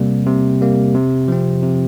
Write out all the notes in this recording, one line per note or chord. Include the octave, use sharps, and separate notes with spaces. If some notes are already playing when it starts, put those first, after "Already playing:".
Already playing: C3 G3 A#3
C3
G3 A#3
C3
F3 C4
C3